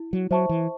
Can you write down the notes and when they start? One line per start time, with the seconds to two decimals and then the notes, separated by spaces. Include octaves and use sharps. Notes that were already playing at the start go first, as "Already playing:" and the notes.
Already playing: E4
0.13 F#3
0.31 F#3 C5 E5 A5 C#6
0.49 E3